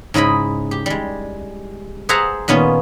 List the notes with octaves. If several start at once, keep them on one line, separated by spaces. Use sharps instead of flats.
G#2 C#3 E4 D#5 B5
G4
G3 G#3
G#4 C5 E5 F#5 A5 A#5
A#2 D#3 B3 C#4 F4